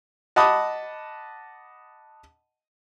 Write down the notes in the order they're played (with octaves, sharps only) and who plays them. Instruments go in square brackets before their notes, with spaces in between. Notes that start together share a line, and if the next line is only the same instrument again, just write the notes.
[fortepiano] D#5 F#5 A5 B5 D6 D#6